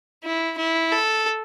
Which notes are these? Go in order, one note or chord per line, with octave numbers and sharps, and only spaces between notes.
E4
E4
A4